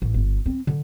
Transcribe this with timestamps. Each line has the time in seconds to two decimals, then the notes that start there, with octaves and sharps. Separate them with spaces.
0.02 A1
0.14 G1
0.46 C4
0.67 D3